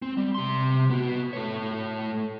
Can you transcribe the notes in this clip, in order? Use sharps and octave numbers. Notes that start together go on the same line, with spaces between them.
C4
G3
C3 C6
B3 F#4
A3 C#5